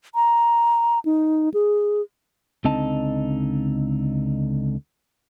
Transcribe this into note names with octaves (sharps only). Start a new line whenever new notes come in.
A#5
D#4
G#4
C#2 D3 C4 D#4 D#5 A5